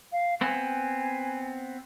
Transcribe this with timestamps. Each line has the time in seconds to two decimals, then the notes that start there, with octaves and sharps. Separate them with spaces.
0.12 F5
0.41 B3 C4 G#5